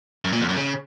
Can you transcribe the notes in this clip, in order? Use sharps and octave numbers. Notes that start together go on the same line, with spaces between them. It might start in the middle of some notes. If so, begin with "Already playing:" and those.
F#2
A#2
F2
F#2
C#3